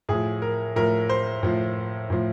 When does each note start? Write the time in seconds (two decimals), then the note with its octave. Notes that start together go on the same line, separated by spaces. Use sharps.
0.09 A2 F3 G#4
0.42 A#4
0.76 A2 F3 A#4
1.09 C5
1.43 A2 F3
2.10 A2 F3